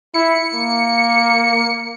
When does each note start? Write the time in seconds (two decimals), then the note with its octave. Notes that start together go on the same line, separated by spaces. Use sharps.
0.14 E4 C#7
0.55 A#3